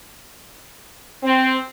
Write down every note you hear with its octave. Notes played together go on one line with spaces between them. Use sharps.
C4